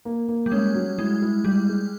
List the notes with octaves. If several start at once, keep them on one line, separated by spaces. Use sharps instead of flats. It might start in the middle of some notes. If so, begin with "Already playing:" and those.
A#3
A#3
G3
G#3 C#4
F#3
G#3 E4
E4
G3 E4
G#3